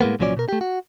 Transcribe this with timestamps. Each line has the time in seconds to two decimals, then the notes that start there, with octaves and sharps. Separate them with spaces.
0.01 A2 G#3 A#3 B3
0.19 C2 A#2 F3 F#3 C#4 D5
0.37 B2 A#4
0.49 A3 G4
0.61 F#4